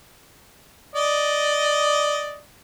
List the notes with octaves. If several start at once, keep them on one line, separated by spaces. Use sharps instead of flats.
D5 D#5